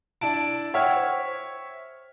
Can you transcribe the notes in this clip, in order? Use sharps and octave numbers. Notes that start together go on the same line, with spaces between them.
D4 E4 A5 D7
C#5 E5 F#5 G5 F6 G#6
C5